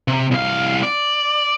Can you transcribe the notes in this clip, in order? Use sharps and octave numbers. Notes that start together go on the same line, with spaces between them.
C3
C2 F5
D5